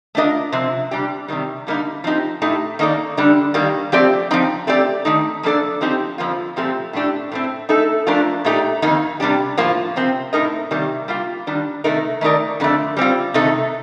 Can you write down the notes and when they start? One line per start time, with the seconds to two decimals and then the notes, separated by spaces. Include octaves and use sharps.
0.15 A3 D4 F4 A#4 D#5
0.52 C3 F3 C4
0.91 G3 D4 G4
1.28 C3 D#3 G3
1.67 D3 G3 A#3 D#4
2.04 F3 C4 D#4 G4
2.42 A2 A3 D#4 G4
2.79 D#3 A#3 D#4 A4 D5
3.17 D3 G3 D4
3.54 D#3 G3 A#3
3.92 F3 A3 C4 G4 D5
4.31 F3 C4 D#4
4.67 A3 C4 G4 D5
5.05 D#3 A3 D#4
5.43 F3 A#3 D4 A4 D5
5.81 F3 C4 D#4 G4
6.18 F2 D3 F3 A#3 F4
6.56 A#2 F3 A3 C4 G4
6.93 A2 A3 D4 G4
7.32 A2 A3 C4
7.69 A3 D#4 A4
8.07 F3 A3 D4 F4 A#4
8.45 A#2 A3 D#4 G4
8.82 F2 D#3 A#3 D#4
9.20 C3 G3 D4 G4
9.58 A2 F3 A#3 F4
9.96 C3 F3 C4
10.33 A2 A3 D#4 A#4 D#5
10.71 C3 D#3 G3 A#3
11.08 G3 A#3 F4
11.47 D#3 G3 D4
11.84 C3 D#3 A3 D#4 A#4
12.21 D#3 A3 D#4 A#4 D5
12.60 F2 D3 A3
12.97 G3 C4 F4
13.34 C3 D#3 A3 D#4 A4